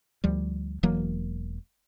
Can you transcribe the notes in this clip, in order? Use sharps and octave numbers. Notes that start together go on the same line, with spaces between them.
D2 F3 G3
E1 E3 F#3 A#3